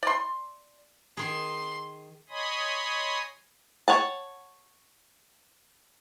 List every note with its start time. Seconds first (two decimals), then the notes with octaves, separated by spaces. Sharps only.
0.03 D5 C6
1.17 D#3 G#4 C6
2.29 C#5 D#5 G#5 B5 C6 D#6
3.88 C#5 F#5 A5